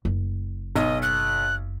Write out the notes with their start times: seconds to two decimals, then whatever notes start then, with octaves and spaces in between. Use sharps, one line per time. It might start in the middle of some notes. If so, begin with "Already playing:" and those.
0.05 F#1
0.76 B1 D#5
1.02 F#6